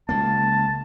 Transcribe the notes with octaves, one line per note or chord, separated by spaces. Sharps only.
C#2 A#3 A5